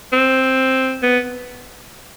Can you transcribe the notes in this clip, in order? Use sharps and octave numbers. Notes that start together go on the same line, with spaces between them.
C4
B3